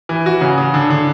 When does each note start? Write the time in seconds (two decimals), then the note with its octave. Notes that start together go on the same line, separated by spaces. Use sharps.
0.09 E3
0.26 F#4
0.41 C#3
0.58 C#3
0.74 D3
0.90 D3